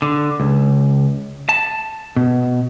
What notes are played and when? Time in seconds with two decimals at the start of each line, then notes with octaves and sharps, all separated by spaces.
0.02 D3
0.40 C#2
1.49 A5
2.16 B2